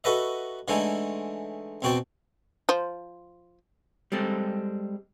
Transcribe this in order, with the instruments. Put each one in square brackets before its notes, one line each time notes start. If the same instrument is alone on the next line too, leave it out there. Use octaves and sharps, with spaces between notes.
[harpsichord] F#4 A4 B4 D#5 E5
D3 E3 G#3 A3 D#4 E4
E2 B2 C4 F#4 G5 A5
[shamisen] F3 C5
[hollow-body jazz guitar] G3 G#3 C4 A4